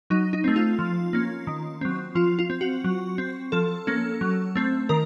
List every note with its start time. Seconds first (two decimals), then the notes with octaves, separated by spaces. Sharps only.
0.10 F#3 D#4
0.33 D#4
0.44 A3 C4
0.56 F4
0.79 F3
1.13 A#3 C#4
1.47 D#3
1.81 F#3 C4
2.15 F3 F4
2.39 F4
2.50 C4
2.61 F#4
2.84 F#3
3.18 C4
3.52 F3 A4
3.87 A#3 C#4
4.21 F#3
4.56 A3 C4
4.89 D#3 A#4